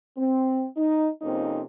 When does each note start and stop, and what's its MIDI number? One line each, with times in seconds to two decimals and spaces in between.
0.18 0.66 60
0.77 1.09 63
1.22 1.62 41
1.22 1.62 48
1.22 1.62 58
1.22 1.62 60
1.22 1.62 61
1.22 1.62 63